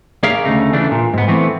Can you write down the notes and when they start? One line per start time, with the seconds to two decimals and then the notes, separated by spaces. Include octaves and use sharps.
0.23 A#3 G#4 C#5 D5 E5 F5
0.45 D2 C#3 A3 D#4
0.73 C#3 E3 A3 D4
0.91 A#2
1.14 G#2 B3
1.28 E3 A3 B3 C4